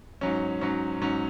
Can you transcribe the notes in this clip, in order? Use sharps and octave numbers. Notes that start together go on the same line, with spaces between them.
G#2 F#3 C#4
G#2 F#3 C#4
G#2 F#3 C#4